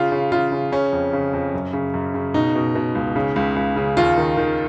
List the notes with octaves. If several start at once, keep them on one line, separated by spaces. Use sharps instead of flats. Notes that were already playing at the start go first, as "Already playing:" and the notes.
Already playing: C#3 F4
C#3
C#3 F4
C#3
C#3 C#4
F2
C#3
F2
F#2
C#3
F#2
C#3
B2 D#4
B2
B2
C#2
C#3
C#2
C#2
C#3
D#2 F4
D#3
D#3